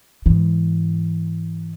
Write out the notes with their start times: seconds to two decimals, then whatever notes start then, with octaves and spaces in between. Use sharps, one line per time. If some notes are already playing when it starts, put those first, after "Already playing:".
0.26 G#2 E3